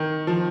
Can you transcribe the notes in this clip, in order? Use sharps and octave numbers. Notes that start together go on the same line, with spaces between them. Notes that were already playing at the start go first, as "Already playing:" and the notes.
Already playing: D#3
F3